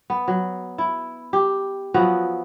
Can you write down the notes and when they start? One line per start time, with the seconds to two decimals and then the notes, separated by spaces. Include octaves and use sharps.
0.10 B3
0.28 F#3
0.78 E4
1.33 G4
1.94 F3 F#3 B3 F#4